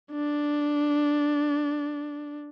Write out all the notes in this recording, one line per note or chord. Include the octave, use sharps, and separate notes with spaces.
D4